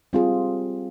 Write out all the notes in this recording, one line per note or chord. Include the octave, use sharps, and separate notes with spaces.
G3 C4 F4 G#4